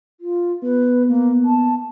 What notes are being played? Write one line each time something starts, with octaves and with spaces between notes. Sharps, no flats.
F4
B3 B4
A#3
A5